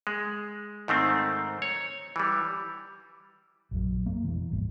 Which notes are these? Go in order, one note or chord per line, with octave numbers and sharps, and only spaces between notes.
G#3
G#2 D#3 A3 C4
C#5
E3 G3
A#1 F#2 F#3
F#2 G#3 A#3 B3
F2 B2 E3
G#1 D#2 G3